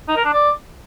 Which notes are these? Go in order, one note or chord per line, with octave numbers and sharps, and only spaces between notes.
D#4
A#4
D4
D5